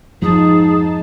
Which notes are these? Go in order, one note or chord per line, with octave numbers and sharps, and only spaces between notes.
F2 G#2 F3 D#4 G#4 A5